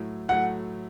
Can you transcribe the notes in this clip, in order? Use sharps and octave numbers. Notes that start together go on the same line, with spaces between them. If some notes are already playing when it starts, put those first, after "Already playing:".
Already playing: A2 F#3 A3
A2 F#3 A3 F#5